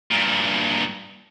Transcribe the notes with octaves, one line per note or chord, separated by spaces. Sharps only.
G2 A#2